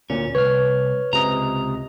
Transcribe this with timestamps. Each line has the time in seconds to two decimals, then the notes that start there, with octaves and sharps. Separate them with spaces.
0.10 D2 A#2 C#4
0.35 C2 B4 C#5 F6
1.13 C#2 C3 D#5 A#5